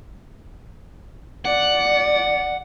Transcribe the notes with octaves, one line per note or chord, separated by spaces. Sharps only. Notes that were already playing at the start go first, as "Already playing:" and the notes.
D5 F#5